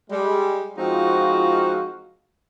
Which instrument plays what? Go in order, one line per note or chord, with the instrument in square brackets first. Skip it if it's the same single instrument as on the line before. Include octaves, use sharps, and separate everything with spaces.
[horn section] G3 G#3
F3 G#3 C4 D#4 F4 F#4